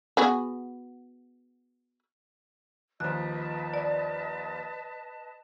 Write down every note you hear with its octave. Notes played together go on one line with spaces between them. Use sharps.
B3 F#4 G#4
D#2 F3 B4 D#5 A5 F#6
D5